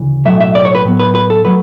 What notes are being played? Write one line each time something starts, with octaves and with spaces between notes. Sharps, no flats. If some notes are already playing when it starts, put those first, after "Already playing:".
Already playing: D2 C#3 E3
B1 A2 F#3 A3 E5
E5
D5
C#5
B4
A2 F#3 B3
B4
B4
A4
F#3 A3 B4